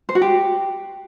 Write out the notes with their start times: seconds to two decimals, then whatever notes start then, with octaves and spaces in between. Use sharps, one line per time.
0.09 C5
0.15 F#4
0.22 G4